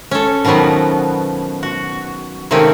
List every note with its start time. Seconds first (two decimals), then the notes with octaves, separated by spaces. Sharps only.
0.11 C#4 A4
0.45 B2 D#3 F3 F#3 B3
1.63 F#4
2.51 C3 D#3 A3 A#3 C4 C#4